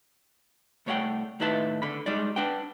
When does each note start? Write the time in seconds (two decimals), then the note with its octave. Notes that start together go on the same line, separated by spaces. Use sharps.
0.86 C2 A3 C#5 D5 F#5 G5
1.40 D#2 A2 D#4 B4 E5 A5
1.82 D3 B5
2.06 G3 G#3 D#4 D5
2.36 D4 B4 F#5 G5